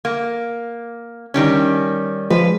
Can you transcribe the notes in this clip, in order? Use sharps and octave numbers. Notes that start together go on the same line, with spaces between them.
A#3
D#3 G3 C#4
F3 G#3 B4